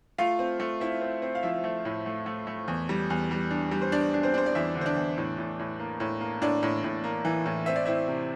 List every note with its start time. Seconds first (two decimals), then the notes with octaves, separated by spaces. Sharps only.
0.18 A3 F4 F5
0.39 C4
0.60 A3
0.80 C4 E4 E5
1.01 C4
1.22 C4
1.35 F5
1.43 F3 E4 E5
1.64 A3
1.85 A2
2.06 A3
2.26 A3
2.47 A3
2.68 E2
2.89 G3
3.10 E2
3.31 G3
3.50 D4
3.71 G3
3.82 C5
3.92 D4 D5
4.14 D4
4.23 C4 C5
4.34 D4 C5
4.46 D5
4.55 E2 E4 E5
4.75 D3
4.81 C5
4.86 D4 D5
4.96 E2
5.18 A2
5.38 A2
5.59 A2
5.79 A#3
6.00 A2
6.21 A#3
6.42 A2 D4 D5
6.63 A2
6.84 A2
7.04 A#3
7.25 E3
7.46 A2
7.66 C4 E5
7.76 D5
7.85 C4 E4 E5
8.08 C3